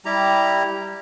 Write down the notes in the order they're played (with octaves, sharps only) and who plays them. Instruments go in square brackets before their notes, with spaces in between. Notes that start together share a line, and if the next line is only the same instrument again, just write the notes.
[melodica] G3 E4 G4 A#5